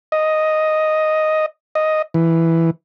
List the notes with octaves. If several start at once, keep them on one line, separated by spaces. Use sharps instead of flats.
D#5
D#5
E3